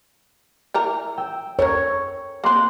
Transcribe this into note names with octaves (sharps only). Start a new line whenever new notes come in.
E3 A#4 A#5
G5 E6
A4 A#4 C#5
A#3 C4 A#5 C6 F#6